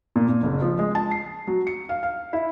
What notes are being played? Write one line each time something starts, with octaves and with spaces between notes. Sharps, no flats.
A#2
A#2
F#1
F3
G#3
A5
C7
F#3
C#7
F5
F5
E4